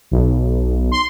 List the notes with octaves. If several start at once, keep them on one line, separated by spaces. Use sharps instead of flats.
B1
C6